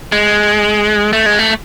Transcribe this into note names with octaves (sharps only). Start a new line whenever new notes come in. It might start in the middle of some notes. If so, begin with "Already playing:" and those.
G#3
A3
G#3
A3